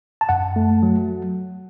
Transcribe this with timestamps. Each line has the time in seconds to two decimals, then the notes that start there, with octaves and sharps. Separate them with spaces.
0.21 A5
0.29 F#2 F#5
0.56 A3
0.83 F#3